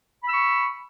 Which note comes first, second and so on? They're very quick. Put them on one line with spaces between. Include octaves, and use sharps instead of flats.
B5 E6 C#6